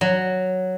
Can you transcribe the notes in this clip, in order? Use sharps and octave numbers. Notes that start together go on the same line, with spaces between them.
F#3